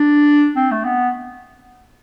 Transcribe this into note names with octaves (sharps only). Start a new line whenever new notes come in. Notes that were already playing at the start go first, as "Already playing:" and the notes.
Already playing: D4
C4
A3
B3